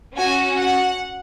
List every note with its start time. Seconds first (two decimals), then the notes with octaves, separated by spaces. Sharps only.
0.16 C#4 F#4 G#5
0.57 F#5